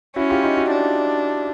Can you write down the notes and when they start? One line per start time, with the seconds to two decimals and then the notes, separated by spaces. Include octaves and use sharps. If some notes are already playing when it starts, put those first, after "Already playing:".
0.16 C#4 E4 F#4
0.30 F4 G4
0.43 D#4 F4
0.57 E4 F#4
0.71 D4